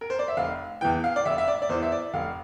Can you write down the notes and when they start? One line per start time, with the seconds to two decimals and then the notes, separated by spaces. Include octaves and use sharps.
0.01 A#4
0.10 C5
0.19 D5
0.28 E5
0.37 F1 F5
0.81 E2 E3 G5
1.04 F5
1.16 D5
1.25 F1 E5
1.38 E5
1.48 D5
1.62 D5
1.69 E2 C5
1.74 E3
1.82 E5
1.92 D5
2.14 F1 F5